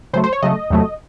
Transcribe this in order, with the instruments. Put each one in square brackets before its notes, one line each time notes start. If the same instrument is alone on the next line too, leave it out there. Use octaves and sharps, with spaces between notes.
[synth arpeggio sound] C#3 F#3 A3 C5
C5
C#5
C#3 F#3 A3 D#5
E2 C3 F#3 A3